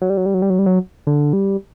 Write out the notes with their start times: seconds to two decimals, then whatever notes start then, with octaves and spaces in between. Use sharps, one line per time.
0.01 F#3
0.10 G3
0.17 F#3
0.26 G3
0.34 F#3
0.42 G3
0.50 F#3
0.59 G3
0.66 F#3
1.07 D3
1.33 G3